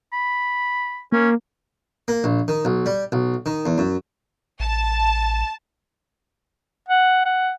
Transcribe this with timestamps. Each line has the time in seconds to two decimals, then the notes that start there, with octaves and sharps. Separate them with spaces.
0.13 B5
1.12 A#3 C#4
2.08 A#3
2.24 A#1
2.48 D#3
2.65 B1
2.86 G3
3.12 B1
3.46 D#3
3.66 E2
3.78 F#2
4.60 A1 A5
6.89 F#5
7.26 F#5